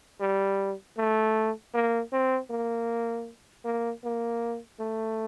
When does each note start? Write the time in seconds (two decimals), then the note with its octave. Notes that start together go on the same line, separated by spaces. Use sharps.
0.20 G3
0.98 A3
1.74 A#3
2.12 C4
2.50 A#3
3.65 A#3
4.04 A#3
4.80 A3